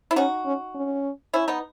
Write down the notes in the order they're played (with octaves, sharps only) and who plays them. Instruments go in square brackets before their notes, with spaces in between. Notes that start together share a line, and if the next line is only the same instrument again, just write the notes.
[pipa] E4
[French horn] C#4 [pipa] D#4 F#4
[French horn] C#4
C#4
[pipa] C#4 E4
B3 D#4